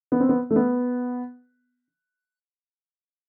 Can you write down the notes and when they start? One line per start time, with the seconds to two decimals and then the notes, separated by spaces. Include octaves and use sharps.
0.12 B3
0.20 C4
0.29 B3
0.50 A3
0.56 B3